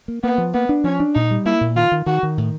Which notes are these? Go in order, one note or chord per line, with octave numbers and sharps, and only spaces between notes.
A#3
A#3 B3
F3
A#3 B3
D4
F3 C#4
D4
A#2 D#4
G3
A#3 E4
A#2
D#3 F4
D#3
D#3 F#4
D#3
A2